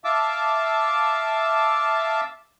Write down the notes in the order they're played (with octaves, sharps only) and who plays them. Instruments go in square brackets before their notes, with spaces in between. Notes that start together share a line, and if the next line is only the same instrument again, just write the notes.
[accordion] E5 F5 A5 D6 E6